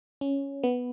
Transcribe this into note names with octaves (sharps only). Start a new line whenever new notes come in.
C#4
B3